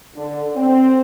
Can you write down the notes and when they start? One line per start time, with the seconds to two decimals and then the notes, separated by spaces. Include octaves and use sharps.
0.16 D3
0.55 C4